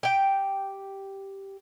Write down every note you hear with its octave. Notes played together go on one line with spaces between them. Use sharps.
G4 G5